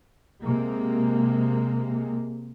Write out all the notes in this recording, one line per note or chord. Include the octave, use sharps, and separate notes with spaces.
C3 G#3 A#3